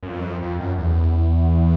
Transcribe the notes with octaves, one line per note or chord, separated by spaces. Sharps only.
F#2
F2
F#2
F2
F2
F#2
E2